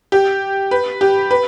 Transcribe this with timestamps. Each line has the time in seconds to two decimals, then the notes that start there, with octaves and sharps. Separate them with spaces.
0.12 G4
0.71 B4
1.01 G4
1.31 B4